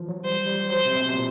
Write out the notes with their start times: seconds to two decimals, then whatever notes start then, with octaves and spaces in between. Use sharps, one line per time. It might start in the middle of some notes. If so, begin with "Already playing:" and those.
Already playing: E3 F3
0.08 F#3
0.24 G3 C5
0.47 G3
0.70 F#3 C5
0.85 C3
0.95 C3
1.00 B2
1.15 A#2